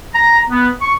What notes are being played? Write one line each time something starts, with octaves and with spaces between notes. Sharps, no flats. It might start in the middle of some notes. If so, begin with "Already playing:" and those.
A#5
B3
C#6